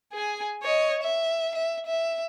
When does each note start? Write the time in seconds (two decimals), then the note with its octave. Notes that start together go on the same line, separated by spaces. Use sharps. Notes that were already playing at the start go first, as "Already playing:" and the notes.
0.13 G#4 G#5
0.63 C#5 D#5
1.02 E5
1.55 E5
1.86 E5